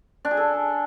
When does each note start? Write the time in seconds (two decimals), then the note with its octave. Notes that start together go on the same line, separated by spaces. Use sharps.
0.25 D4
0.31 G#4
0.37 A4